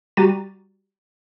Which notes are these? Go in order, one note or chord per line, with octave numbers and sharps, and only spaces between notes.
G3 F#4 G4 A#5 A6 D#7